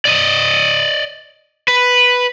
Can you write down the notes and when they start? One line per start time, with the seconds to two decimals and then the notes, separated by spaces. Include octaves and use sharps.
0.05 D5 D#5
1.68 B4